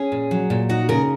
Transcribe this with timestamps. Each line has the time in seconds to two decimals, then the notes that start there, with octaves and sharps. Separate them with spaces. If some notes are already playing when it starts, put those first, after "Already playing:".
Already playing: C#4 G#4
0.12 A#2
0.31 F#3
0.50 A#2
0.69 D#4 F#4
0.89 C#3 A#4